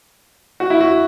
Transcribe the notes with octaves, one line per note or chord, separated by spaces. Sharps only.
F#4
E4
F#4